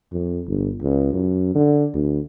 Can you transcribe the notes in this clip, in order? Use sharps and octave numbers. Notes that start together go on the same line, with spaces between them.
F2
G1
C#2
F#2
D3
D2